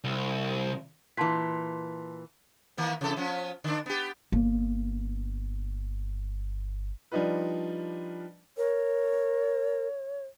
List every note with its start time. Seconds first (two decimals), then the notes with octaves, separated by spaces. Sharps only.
0.04 C2
1.17 A#2 E3 A5 C6 B6
2.77 D#3 A#3 B3
3.01 C3 E3 A4
3.17 F3 B3 C#4
3.64 D3 D4
3.86 B3 G4
4.32 G1 A#3
7.12 F3 G3 D4 D#4 F4 B4
8.57 A#4 C#5